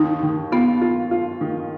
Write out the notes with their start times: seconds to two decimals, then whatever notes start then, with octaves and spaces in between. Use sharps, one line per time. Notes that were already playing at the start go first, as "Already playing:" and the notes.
Already playing: D#2 D#3 D#4
0.23 D#3
0.52 B3 F4
0.82 F4
1.11 F4
1.41 D#3